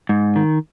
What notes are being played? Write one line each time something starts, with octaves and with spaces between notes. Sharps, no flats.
G#2
D#3